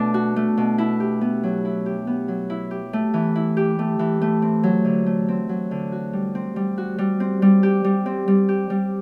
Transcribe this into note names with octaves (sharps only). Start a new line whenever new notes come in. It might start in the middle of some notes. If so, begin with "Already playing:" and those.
Already playing: B2 A3 D4
F#4
A3
B2
E4
G4
B3
F#3
E4
G4
B3
F#3
E4
G4
A3
E3
E4
G4
A3
E3
A3
C4
F#3
D3
A3
C4
F#3
D3
F#4
G3
C4
G3
F#4
G3
C4
G3
G4
G3
C4
G3
G4
G3